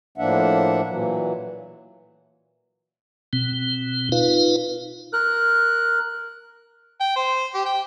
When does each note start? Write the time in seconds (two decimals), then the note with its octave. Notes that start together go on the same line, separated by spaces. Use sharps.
0.18 A2 F3 A#3 D4 E5 F#5
0.87 A#2 E3 F#3
3.33 B2 C4
4.12 D#4 F4 B4 F5
5.13 A#4 F#6
7.00 G5
7.16 C5
7.54 G4
7.66 G5